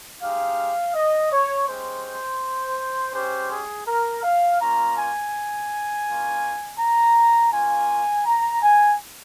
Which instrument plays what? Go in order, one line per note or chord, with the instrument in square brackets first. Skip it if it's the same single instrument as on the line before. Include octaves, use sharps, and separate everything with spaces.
[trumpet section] G#3 D#4 G4 F5
D#5
C#5
G#3 C#4 G4 C5
G#3 C#4 G4 C5
G#4
A#4
F5
A#3 C#4 F4 A#5
G#5
A#3 C#4 F4
A#5
A#3 C#4 F4 G#5
A#5
G#5